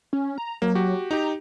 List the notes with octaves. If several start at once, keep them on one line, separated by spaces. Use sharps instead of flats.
C#4
A#5
F#3 A#3
F#4 G4
D#4 G4 A#5